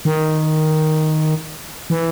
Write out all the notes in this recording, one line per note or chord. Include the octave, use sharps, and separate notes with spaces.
D#3
E3